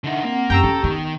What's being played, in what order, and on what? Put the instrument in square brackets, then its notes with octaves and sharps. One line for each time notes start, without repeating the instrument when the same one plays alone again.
[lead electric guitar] D3 D#4 [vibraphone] D4 E5 F#5
[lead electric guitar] A#3 [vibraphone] C4 F#5
[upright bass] F#2 [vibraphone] G4 C#6 [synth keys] G5 A#5 E6
[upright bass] C#4 [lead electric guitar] A4
[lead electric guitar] D#3 [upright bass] B3